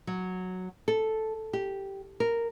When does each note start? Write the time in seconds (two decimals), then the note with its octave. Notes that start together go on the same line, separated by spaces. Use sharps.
0.07 F#3
0.88 A4
1.53 G4
2.20 A#4